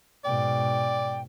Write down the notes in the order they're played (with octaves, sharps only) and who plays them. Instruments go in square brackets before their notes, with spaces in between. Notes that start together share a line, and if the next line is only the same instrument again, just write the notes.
[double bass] G#2 B2 [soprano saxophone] D5 [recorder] G5